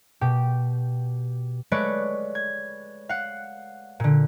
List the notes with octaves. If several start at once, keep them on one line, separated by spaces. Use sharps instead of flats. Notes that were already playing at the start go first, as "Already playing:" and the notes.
B2 G4
G#3 A3 B4 C#5 D5
G#6
F5 F#5
A#2 D3